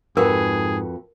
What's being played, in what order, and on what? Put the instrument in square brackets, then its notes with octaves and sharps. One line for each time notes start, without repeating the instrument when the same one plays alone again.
[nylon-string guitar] F2 F#4 B4 [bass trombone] G#2 [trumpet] G#4 [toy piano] A#4